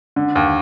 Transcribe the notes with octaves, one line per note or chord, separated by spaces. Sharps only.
D3
D#2